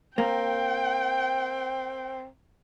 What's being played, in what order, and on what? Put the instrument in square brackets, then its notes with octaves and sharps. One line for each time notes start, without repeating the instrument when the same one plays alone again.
[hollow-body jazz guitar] A#3 [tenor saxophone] C4 [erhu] G5